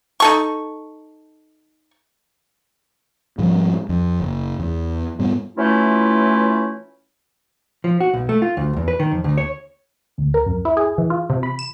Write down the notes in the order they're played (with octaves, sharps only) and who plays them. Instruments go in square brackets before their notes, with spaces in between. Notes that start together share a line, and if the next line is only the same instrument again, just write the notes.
[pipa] D#4 A4 C#6
[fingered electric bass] G#2 F3 G3
F2
F#1
E2
G#2 G3 B3
[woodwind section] E3 F#3 A3 C#4 E4 F4
[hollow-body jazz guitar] F3
F#4
B1
A3
F4
D2
E2
B4
D#3
F2
D2
C#5
[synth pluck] D2
A#4
F#2
E4
G#4
E3
F4
C3
B5
E7